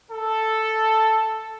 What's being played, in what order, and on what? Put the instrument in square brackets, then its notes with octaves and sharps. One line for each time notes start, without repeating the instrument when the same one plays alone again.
[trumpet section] A4